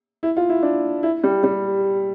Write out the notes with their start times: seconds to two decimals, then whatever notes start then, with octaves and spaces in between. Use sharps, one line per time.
0.23 E4
0.37 F4
0.49 E4
0.63 D4
1.03 E4
1.24 G3
1.43 G3